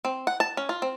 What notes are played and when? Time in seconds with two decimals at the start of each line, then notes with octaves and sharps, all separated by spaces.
0.05 C4
0.27 F#5
0.40 A5
0.57 C#4
0.69 F4
0.82 C4